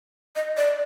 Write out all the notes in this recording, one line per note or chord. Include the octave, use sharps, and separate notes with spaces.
D#5
D5